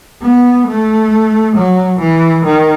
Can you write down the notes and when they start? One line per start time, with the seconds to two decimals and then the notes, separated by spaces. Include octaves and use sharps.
0.22 B3
0.67 A3
1.56 F#3
2.00 E3
2.45 D#3